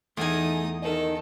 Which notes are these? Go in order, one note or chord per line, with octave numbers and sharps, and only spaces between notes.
E2 A3 D#4 G#5 D#6
D#4 A4 A#4 D#5